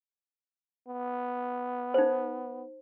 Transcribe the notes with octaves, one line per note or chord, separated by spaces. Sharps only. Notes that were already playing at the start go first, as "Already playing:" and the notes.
B3
D#4 C5